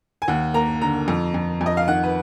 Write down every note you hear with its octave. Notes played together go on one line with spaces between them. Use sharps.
G#5
D#2 F#5
A#3 A#5
D3 A#5
F2
F2
F2
D#5
F5
D#3 F#5
B4